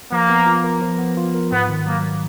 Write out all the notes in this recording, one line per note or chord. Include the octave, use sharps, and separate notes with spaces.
F3 A#3
B3
F4
A#4
F3
B3
F4
A#4
G#2 B3
D#3
F#3 A#3